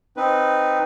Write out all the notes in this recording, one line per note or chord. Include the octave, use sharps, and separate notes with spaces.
C4 D#4 B4